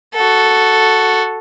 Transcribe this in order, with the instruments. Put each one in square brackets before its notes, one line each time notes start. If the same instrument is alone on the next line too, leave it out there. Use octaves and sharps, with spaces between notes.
[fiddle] F#4 A4